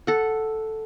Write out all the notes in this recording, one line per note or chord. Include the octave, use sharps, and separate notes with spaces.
A4 F#5